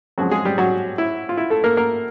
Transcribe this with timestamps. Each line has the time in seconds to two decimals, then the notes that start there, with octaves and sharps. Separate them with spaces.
0.18 F2 C#3 F3 F#3 G#3 F#4
0.31 G#3 G#4
0.45 G3 G4
0.58 F#3 F#4
0.98 E4
1.29 F4
1.37 E4
1.50 A3 A4
1.64 A#3 A#4
1.77 A#3 A#4